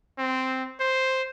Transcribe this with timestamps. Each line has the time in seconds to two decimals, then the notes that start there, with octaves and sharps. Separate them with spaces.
0.18 C4
0.80 C5